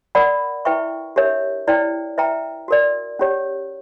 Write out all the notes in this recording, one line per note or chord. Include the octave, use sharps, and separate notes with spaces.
A#4 D5 F#5 B5
E4 B4 E5 G5 C#6
D4 G4 A#4 C#5 E5
E4 B4 D5 G5
B4 E5 G5 A#5
F#4 A#4 D5
C#4 G4 C#5